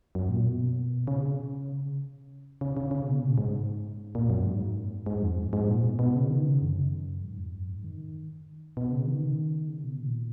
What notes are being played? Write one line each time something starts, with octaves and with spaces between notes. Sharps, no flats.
F#2
A#2
B2
C#3
C#3
C#3
C#3
B2
A#2
G#2
A#2
F#2
G#2
G#2
F2
G#2
A#2
B2
B2
C#3
D#3
C#3
F#2
G#2
F2
F#2
G#2
D#3
B2
C#3
D#3
C#3
B2
A#2